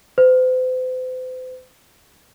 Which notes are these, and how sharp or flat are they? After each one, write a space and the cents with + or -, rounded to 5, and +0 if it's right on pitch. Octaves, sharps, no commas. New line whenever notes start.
C5 -40